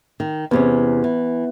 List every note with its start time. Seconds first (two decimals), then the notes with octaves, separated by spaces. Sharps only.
0.20 D#3
0.51 E2 C3 B3 C#4 B4
1.04 E3